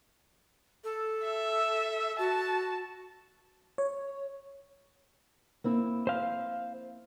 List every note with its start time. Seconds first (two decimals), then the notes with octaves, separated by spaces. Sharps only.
0.84 A4
1.23 E5
2.18 F#4 A5
3.78 C#5
5.64 A#3 C4 E4
6.07 C5 F5